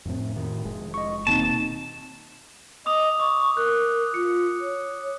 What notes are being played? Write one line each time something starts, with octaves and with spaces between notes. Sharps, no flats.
F2 A2 C4
A2 D#3
F1 G#3
D#5 C#6
D#1 B2 D#3 A#3 C4 D#4 A5
D#5 D6 D#6 F7
C#6 D6
A#4 F#6
F4 C#7
C#5